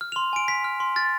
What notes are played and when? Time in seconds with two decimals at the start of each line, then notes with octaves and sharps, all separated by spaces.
0.01 F6
0.12 F7
0.16 C6
0.33 G#5 D7
0.48 G#5 B6
0.64 F6
0.80 C6
0.96 F6 A6